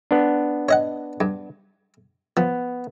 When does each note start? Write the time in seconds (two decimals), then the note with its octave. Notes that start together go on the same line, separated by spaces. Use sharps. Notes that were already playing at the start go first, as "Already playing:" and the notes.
0.11 B3 D4
0.69 C#5 D#5 F#5
1.20 G2
2.37 F3 B3